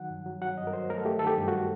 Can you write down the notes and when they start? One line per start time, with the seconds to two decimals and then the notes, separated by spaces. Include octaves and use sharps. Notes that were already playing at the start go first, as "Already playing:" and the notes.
Already playing: D#3 F#3 F#5
0.10 G2
0.26 F#3
0.42 F#3 F#5
0.57 G2 D#5
0.67 A#4
0.73 F#3 C5
0.89 A3 A#4
0.98 A4
1.05 A3 G4
1.19 D#3 A4
1.27 G4
1.37 G2
1.48 F#4